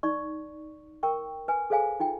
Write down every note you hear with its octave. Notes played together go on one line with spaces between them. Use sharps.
D#4 D5 C#6
A#4 G5 C#6
B4 G#5
G#4 A4 C5 F5 G#5
D#4 F4 G5